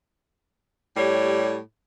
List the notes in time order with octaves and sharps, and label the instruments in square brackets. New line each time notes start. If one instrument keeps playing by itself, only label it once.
[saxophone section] A2 G3 G4 C#5